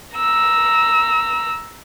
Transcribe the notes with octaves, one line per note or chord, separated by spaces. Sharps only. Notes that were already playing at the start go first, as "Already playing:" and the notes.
A#5 E6